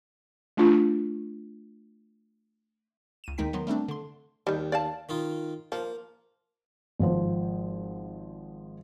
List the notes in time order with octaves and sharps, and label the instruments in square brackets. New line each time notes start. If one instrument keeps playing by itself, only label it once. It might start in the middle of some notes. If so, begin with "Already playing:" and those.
[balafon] A3 D4 F4
[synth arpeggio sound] C#2 D#7 E7
D#2 D#3 G#3 D#4 G5 B6
D#3 F#3 B3 C6
G3 A3 C4 D4
D3 C6
[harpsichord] D#2 [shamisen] G3 D#4
[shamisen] D5 F5 A5
[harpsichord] D#3 D#4 F4
[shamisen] F3 [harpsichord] A#3
[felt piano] G#1 F3 C5